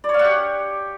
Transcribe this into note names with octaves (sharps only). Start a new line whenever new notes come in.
D5
C#5
F5
F#5
G4